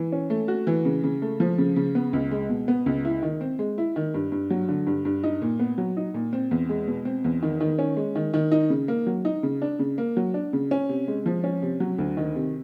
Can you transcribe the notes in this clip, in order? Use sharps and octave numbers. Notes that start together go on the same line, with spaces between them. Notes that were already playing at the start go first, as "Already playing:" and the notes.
Already playing: E3
C#4
A3
F#4
E3
C#3
C#3
A3
F3
C#3
C#3
B3
C#2
G#3
B2
B3
C#2
E4
D#3
C4
G#3
E4
D#3
G2
G2
F#3
D3
G2
G2
D#4
A#2
B3
F#3
D#4
A#2
C4
E2
G#3
B2
C4
E2
D#3
D#3
C#4
G#3
D#3
D#3
D#4
C#3
A#3
F#3
D#4
C#3
D4
C#3
A#3
F#3
D4
C#3
C#4
C3
G#3
F3
C#4
C3
F#3
D2
D#3
C3